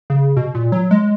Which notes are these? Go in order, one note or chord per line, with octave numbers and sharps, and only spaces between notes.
C#3
B2
A#2
F#3
G#3